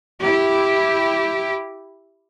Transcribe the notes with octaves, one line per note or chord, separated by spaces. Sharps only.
E4 G4